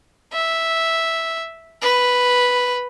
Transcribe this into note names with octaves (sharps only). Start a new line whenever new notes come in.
E5
B4